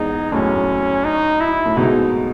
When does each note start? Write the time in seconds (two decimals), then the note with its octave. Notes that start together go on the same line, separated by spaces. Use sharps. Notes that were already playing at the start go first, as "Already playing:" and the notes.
Already playing: E2 G#2 D#4
0.32 F#2 A2 C#4
1.05 D#4
1.41 E4
1.66 A2
1.76 G#2 B2 D#4